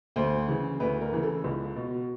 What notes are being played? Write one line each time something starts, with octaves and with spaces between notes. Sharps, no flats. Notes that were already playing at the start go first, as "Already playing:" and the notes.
D2 C5
C#3 E3
D2 B4
A#4
C#3 E3
A4
C#2
B2